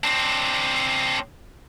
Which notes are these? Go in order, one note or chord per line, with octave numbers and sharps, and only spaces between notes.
C4 D4